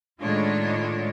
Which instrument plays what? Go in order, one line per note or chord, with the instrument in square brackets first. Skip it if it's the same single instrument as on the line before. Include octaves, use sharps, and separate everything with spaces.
[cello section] A2 D#3 G#3 D4 F4 C#5